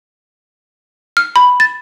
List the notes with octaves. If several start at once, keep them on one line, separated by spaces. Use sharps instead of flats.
F6
B5
A6